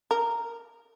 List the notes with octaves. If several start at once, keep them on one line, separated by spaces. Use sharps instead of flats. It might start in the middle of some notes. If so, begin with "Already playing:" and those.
A#4